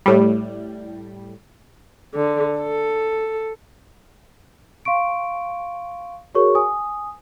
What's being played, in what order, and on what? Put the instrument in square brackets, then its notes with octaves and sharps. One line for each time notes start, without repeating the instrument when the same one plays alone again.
[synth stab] A2 G3
[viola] D3
A4
[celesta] F5 C6 C#6 D7
F#4 G#4 A#4 C#5 C#6
G#5 D#6